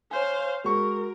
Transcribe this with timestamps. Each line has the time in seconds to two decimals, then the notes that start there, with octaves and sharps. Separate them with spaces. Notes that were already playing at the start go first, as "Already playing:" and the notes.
0.11 C5 C#5 F5 G#5
0.64 G#3 F#4 A#4 C#6